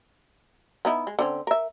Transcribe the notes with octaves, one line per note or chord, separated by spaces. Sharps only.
B3 D#4 E4
G#3
D3 C4 C#4
A#4 E5